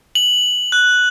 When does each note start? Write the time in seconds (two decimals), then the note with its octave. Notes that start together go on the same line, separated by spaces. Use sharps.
0.15 F#7
0.72 F#6